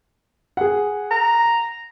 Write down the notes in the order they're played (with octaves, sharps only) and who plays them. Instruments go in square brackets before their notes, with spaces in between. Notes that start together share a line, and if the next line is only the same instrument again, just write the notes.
[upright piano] G#4 F#5
[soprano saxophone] A#5